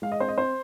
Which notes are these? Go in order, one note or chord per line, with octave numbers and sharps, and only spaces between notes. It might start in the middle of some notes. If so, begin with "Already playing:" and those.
G#3 F5
D#5
C4 C5
D#5
C4 C5